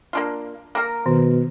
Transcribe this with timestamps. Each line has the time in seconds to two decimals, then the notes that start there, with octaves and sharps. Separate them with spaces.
0.13 A#3 D4 F4
0.75 A#3 A#4
1.06 B2 D#3